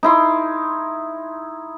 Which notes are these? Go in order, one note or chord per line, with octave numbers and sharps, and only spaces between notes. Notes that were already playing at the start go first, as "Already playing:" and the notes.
D#4 E4 C6